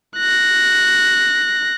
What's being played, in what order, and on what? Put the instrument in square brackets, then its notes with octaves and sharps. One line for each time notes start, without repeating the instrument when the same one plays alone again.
[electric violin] F#6 A#6